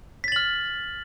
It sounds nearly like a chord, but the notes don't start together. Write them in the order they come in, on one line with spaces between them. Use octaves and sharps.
B6 A6 F#7 F6